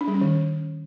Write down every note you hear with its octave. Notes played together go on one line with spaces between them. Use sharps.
D4
G3
C#4
D#3